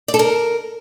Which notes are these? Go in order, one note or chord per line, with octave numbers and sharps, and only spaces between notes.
D5
A4
A#4